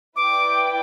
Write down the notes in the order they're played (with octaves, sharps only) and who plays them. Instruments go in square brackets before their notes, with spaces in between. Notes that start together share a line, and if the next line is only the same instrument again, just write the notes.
[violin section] E4 B4 D5 G5 [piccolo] D6